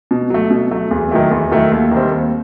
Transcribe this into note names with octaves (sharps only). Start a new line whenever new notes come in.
B2
F#3 A3
B2
F#3 A3
E2
D#3 F#3 A3 E4
E2
D#3 F#3 A3 E4
D#2
D#3 G3 C4
D#2